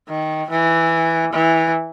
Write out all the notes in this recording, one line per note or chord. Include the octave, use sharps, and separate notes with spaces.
D#3
E3
E3